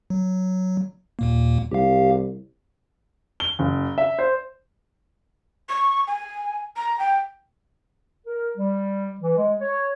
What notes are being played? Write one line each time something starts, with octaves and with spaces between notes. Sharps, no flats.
F#3
D#2 A#2 A#3
C2 G4 F5
G7
F#1
E5
C5
C#6
G#5
A#5
G5
A#4
G3
E3
G#3
C#5